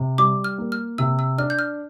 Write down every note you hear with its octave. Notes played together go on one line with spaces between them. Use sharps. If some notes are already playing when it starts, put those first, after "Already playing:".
Already playing: C3
G3 D6
F6
A#3
F6
C3 E6
E6
D4 F6
G6
F6